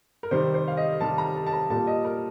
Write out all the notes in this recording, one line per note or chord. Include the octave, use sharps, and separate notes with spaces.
A#4
C3 D#3 G3 C5
C5
F5
D#5
C3 D#3 G3 A5
A#5
A5
A5
A#5
A#2 G3 A5
D#5
A#4